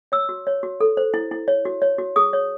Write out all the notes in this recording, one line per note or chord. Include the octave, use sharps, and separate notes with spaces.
C#5 E6
F#4
C#5
F#4
A4
C5
E4
E4
C#5
F#4
C#5
F#4
G#4 D#6
C#5